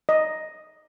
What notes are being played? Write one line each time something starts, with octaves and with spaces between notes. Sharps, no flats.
D#5